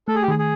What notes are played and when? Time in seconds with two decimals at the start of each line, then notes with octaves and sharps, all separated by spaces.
0.08 A3 A4
0.15 G#4
0.23 G4
0.28 D#3 G#4
0.38 G#4